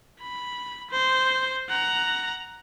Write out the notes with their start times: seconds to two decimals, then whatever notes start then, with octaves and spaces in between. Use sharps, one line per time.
0.21 B5
0.91 C5
1.69 F#5 A#5